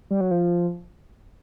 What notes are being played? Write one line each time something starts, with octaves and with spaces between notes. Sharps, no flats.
G3
F#3
F3